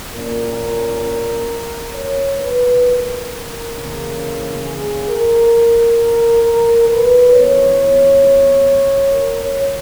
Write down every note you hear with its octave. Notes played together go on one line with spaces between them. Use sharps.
A#2 A#3 C#4 A#4
C#5
B4
A#4
C#3 E3 A#3
G#4
A#4
A#4
B4
E3 B3 C#5
A#4
C#5